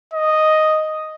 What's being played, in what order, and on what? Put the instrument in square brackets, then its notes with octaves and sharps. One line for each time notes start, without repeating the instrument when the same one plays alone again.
[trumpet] D#5